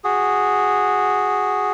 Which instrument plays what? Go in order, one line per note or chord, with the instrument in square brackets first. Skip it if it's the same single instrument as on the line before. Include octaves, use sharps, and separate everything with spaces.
[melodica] F#4 G#4